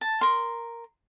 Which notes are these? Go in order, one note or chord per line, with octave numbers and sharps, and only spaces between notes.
A5
A#4 C6